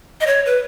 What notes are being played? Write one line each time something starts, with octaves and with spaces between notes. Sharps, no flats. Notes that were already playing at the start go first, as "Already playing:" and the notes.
D#5
C#5
B4